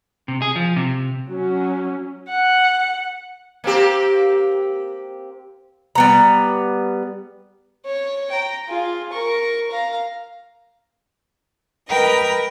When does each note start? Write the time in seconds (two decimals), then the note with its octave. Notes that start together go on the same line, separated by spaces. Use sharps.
0.28 C3
0.42 G#4
0.56 F3
0.76 C3
1.28 F#3 C#4
2.29 F#5
3.64 A#3 C4 G4
5.95 G3 B3 A#5
7.86 C#5
8.31 G5 A#5
8.68 F4 G#4
9.10 A#4 C#6
9.71 F5 A#5
11.89 A#4 B4 D#5 G5 A#5